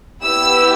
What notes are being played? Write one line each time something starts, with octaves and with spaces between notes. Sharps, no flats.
B3 E4 G4 E6